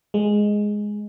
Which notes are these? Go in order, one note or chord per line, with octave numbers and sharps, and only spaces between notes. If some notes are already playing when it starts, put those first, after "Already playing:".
G#3